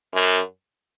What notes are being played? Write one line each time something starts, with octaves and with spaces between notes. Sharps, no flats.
F#2